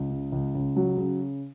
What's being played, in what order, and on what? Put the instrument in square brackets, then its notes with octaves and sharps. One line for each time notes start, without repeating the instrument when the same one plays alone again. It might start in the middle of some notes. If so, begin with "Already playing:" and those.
Already playing: [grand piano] C#2
C#3
C#2
C#2
F#3
C#3